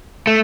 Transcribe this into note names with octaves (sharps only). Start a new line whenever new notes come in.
A3